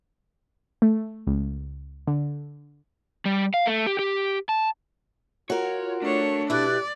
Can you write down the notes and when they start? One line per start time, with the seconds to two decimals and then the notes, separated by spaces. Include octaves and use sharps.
0.82 A3
1.27 C#2
2.07 D3
3.25 G3
3.54 F5
3.66 A3
3.87 G4
3.99 G4
4.49 A5
5.50 F4 F#4 A#4 C#5
6.02 A3 D4 C#5
6.50 B2 E4 G4 D5 F#6